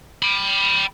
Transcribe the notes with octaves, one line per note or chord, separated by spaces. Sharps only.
G5 B5